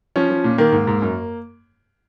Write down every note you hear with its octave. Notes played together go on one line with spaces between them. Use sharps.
F3 C#4
F3
A#2
D#3 A#3
G#2
G#2
F#2